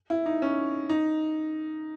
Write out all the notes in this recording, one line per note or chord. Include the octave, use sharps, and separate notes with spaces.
E4
D#4
C#4
D#4